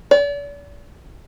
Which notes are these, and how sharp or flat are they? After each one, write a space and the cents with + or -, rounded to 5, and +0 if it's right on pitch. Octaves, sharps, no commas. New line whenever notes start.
D5 -40